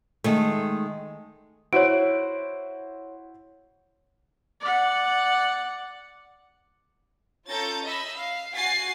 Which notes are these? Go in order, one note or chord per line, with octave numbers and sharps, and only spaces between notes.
D#3 G#3 A3
E4 F#4 C5 C#5 D7
D5 F#5
C#4 F4 A4 A#5 G6 A6
D#5 E5 B5 E6
F5
F#4 G#5 A6 C7